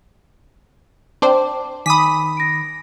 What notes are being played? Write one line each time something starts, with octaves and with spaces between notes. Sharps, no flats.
C4 D4 C5 A5 D6
D#3 G#5 B5 D6 D#6 B6 D#7
A#6 D7